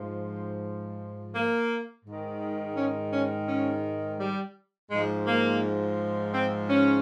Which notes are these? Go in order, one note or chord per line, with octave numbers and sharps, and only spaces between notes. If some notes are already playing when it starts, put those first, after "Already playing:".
Already playing: G#2 F3
A#3
G#2 D#3
C#4
C#4
C#4
G3
G#2 F3 G#3
A#3
C4
C#4